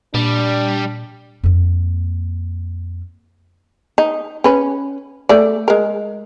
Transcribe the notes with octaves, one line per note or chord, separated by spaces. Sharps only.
A#2 G3 D4
F2 A#3
D#4
C#4 B4
A3 D5
G#3 A#4